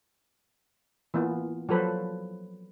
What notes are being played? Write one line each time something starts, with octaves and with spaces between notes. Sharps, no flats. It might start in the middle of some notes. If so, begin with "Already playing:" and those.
E3 A#3 B3 F4
F3 F#3 A4 B4 C5